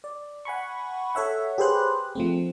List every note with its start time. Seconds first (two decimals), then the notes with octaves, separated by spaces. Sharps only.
0.04 D5
0.45 F#5 G#5 B5 C#6
1.15 A4 C#5 E5 F#5
1.58 G4 G#4 B4 C5 F#6
2.15 F3 A3 C4